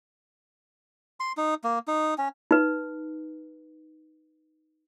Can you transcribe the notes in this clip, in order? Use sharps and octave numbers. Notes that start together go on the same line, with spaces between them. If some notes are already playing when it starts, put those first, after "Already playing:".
C6
D#4
A#3
D#4
C#4
D#4 B4